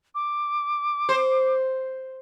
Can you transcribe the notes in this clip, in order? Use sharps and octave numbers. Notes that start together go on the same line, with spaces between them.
D6
C5